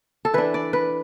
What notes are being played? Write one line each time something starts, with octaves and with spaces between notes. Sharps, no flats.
A4
E3 D4 B4
D5
B4